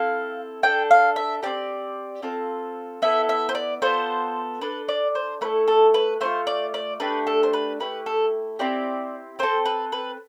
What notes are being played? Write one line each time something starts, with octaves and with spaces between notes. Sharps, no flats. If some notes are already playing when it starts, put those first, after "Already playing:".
Already playing: C4 E4 A4 F5
D4 A4 G5
F5
E5
C4 E4 G4 D5
C4 F4 A4
B3 E4 A4 E5
E5
C5
D5
B3 F4 A4 C5
D4 A4 B4
D5
C5
A3 E4 A4 B4
A4
B4
A3 D4 F4 C5
D5
D5
A3 D4 G4 B4
A4
C5
B4
A3 E4 G4 B4
A4
C4 E4 G4 D5
C4 F4 A4 C5
B4
B4